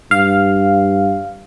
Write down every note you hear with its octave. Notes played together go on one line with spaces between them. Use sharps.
G2 F5